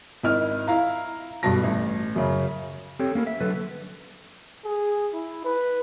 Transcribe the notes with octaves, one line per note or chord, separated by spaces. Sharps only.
G#1 E4 D#5 F6
E4 F5 A#5
B1 G2 B2 A5 A#6
A1
F#2 C#3
C4 G4 A4 C#5
A#3 C#4 A#4
E5
D3 F#3 A4 B4
G#4
E4
B4